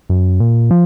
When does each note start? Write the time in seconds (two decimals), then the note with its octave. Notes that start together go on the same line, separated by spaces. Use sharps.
0.10 F#2
0.40 A#2
0.71 F3